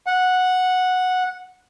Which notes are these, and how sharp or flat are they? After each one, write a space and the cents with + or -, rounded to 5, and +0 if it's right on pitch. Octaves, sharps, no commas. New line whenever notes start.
F#5 -10